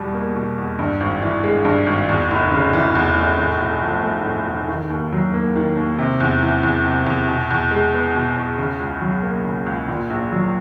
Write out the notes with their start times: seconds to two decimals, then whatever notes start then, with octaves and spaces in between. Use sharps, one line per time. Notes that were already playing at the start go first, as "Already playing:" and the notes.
Already playing: E2 B2 G3
0.14 A#3
0.36 B2
0.58 E2
0.79 G2
1.00 G#1
1.22 E3
1.44 G#3
1.65 G2
1.87 G#1
2.09 E2
2.31 F1
2.51 C#3
2.73 E3
2.95 E2
3.17 F1
3.38 A2
3.60 B1
3.82 F3
4.04 A3
4.26 A2
4.47 B1
4.68 D#3
4.90 D#2
5.12 F#3
5.34 A#3
5.56 D#3
5.77 D#2
5.99 C3
6.20 E2
6.42 E3
6.63 E2
6.85 C3
7.06 E2
7.28 B2
7.51 E2
7.71 G#3
7.94 B3
8.15 B2
8.36 E2
8.58 C#3
8.80 C#2
9.01 F#3
9.23 A#3
9.45 C#3
9.66 C#2
9.88 A#2
10.10 A#1
10.32 F#3